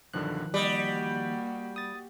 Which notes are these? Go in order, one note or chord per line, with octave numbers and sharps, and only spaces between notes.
B1 G2 D3 D#3 F3 F#6
G3 A#3 F#4 D5 D#5
D#6 A6